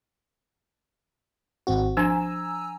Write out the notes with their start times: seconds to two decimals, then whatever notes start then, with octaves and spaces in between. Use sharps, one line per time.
1.67 G#1 C4 F#4
1.97 F3 D4 G#5 A#5 E6